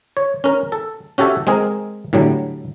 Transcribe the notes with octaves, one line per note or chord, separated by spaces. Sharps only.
C#5
C#4 A#4
A4
C#4 F#4 G4 A4 C#5 E5
G#3 C4 G#4 A#4
A2 D3 F#3 G3